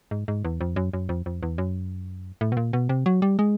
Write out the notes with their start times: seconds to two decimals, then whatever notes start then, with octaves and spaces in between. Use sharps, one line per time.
0.11 G#2
0.28 G#2
0.45 E2
0.61 F2
0.76 F#2
0.94 F#2
1.09 F2
1.26 F2
1.43 E2
1.58 F#2
2.41 A2
2.52 B2
2.57 A#2
2.73 B2
2.89 C3
3.06 F#3
3.22 G3
3.39 G#3